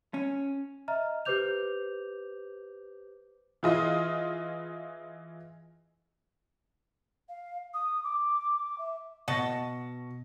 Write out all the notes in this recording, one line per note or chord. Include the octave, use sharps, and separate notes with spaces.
C#4
D#5 E5 A#5 F6
G4 B4 C5 D6 G6 F7
E3 E4 F4 G#4 D#5
F5
D#6
D6
E5
B2 D#5 F#5 A5 C#6 A#6